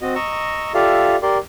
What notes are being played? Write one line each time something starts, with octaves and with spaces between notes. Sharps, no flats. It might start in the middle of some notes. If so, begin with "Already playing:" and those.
C4 F#4 D#5
D#5 A#5 C#6 E6
F4 G4 A4 D5 E5 F5
G4 A#4 D5 C6